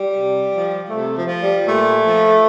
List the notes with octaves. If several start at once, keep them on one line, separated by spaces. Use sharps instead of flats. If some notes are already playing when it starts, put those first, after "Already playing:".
Already playing: G3
C3
F3
C3 A3
F3
F3
G3
A#2 A3
F3